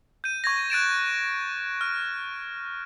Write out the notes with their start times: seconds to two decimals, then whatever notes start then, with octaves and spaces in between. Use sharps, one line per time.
0.24 G6 D#7
0.44 C#6 G#6 A#6
0.70 F#6 A6 D7 E7
1.81 F6